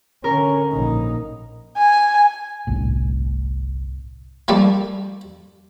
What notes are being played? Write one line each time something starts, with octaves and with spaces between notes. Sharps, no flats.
D3 C#4 A#4
A#1 D#4
G#5
G1 C2 A2
F3 G3 A3 A#3